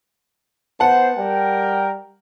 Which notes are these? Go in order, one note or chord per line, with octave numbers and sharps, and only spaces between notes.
B3 C5 F#5 A5
G3 A#4 G5